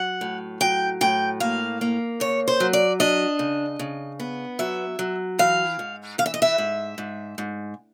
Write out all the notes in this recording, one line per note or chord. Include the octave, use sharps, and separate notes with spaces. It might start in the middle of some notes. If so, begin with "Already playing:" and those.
Already playing: F#3 F#5
A2
F#3 G5
A2 G5
A#3 F5
A#3
C#3 C#5
C5
F#3
D5
D4 D#5
C#3
C#3
B3
F#3 E5
F#3
E3 F5
G#2
E3 F5
E5
D#5
E5
G#2
G#2
G#2